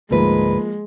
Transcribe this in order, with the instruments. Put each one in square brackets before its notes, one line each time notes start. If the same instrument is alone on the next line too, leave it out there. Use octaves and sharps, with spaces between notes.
[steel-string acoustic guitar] D2 G#2 B4 [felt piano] F3 A#3 [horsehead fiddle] G#3